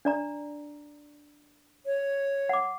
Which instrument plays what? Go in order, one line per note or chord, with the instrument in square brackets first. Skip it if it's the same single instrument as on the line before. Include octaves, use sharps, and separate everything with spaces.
[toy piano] D4 D5 A#5
[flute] C#5
[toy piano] F#5 D6